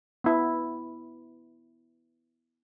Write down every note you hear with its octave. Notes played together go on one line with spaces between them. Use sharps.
B3 E4